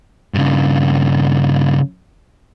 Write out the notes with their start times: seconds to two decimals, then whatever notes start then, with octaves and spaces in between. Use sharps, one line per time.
0.34 G2 C#3